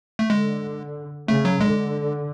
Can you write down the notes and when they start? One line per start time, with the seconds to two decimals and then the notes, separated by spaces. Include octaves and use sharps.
0.19 A3
0.30 D3 G#3
1.28 C#3 A3
1.45 F#3
1.60 D3 G#3